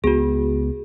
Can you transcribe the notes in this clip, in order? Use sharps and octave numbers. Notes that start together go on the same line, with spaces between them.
C#2 B3 F#4 G#4